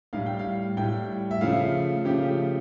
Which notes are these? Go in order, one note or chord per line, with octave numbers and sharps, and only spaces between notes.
A2 G3 F5
G5
F5
A2 G3 G5
E5
C#3 F3 A3 F5
C#3 F3 A3 G4
G4